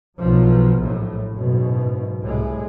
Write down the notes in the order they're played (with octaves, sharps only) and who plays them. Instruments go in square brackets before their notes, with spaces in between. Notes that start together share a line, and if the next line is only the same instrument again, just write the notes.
[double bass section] B1 F3 F#3
A#1 A2
F#1 G#2 B2
C2 A2 G#3